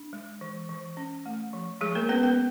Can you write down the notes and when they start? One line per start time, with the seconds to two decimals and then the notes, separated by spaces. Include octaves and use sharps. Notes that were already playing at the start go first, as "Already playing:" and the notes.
Already playing: D4
0.13 G#3
0.41 E3
0.69 E3
0.97 C#4
1.26 A3
1.53 F3
1.81 F3 G#3 G#4
1.95 A#3 A#4
2.09 B3 C#4 B4
2.23 B3 B4